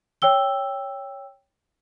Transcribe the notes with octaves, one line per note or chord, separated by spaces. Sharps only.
C#5 G5 E6 G7